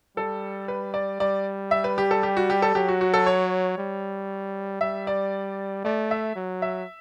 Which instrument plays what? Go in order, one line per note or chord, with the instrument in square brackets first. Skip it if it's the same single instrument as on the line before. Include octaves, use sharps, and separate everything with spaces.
[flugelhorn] G3 [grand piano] A4
[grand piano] B4
D5
[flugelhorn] G3 [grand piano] D5
[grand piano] E5
B4
G4
A4
G4
F#4
G4
A4
[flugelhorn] F#3 [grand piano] G4
[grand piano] F#4
F#4
A4
C#5
[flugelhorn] G3
[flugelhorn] G3 [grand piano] E5
[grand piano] D5
[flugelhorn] A3 [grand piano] D5
[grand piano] E5
[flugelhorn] F#3
[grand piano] E5